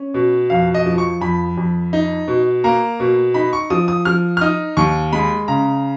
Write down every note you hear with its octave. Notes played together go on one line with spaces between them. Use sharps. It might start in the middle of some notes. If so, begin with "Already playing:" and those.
Already playing: C#4
B2
F2 F5
D#5
F3
C#6
F2 B5
F2
D#4
B2
A#3 A#5
B2
D#4 B5
C#6
F3 D#6
D#6
F3 F6
F6
D#4 D#6
D#2 C#6
G#3 B5
C#3 A#5